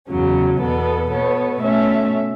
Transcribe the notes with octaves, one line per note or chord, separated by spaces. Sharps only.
E2 C#3 F#3 C#4
E2 B2 B3 A4
B2 B3 A4 C#5
B2 A3 C#4 A4 E5